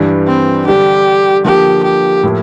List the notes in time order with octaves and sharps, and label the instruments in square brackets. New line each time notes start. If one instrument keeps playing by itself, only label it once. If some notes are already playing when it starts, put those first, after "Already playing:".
Already playing: [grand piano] G2 E3 G3 D4
[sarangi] C4
[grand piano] D3 G3 D4 [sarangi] G4
[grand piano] D3 F3 A#3 [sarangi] G4
[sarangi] G4
[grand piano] A2 F3 A#3 E4